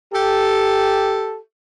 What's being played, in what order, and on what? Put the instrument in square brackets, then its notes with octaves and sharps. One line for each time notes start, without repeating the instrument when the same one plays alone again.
[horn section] G4 A4